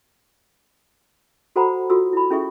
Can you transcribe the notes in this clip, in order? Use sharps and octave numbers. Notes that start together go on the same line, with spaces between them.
F#4 A4 C5 F#5 A#5 B5
F4 F#4 A4 E6
E4 B5
C#4 E4 G#4 A4 E5 C#6